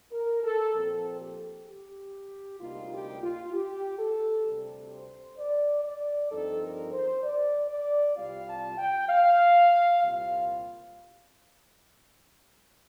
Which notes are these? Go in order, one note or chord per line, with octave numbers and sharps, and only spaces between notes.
A#4
A4
A#2 F3 C4 A4
G4
G4
D2 C3 G3 A#3 D#4 F4
G4
F4
G4
A4
D2 C3 G3
C5
D5
D5
G2 F3 C4 D#4 A4
A#4
C5
D5
D5
C2 C3 G3 C4 F4 F5
A5
G5
F5
C2 A#2 G3 C4 F4 F5